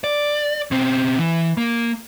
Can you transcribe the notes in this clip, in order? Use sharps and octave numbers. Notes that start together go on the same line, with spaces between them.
D5
B2 C4
E3
A#3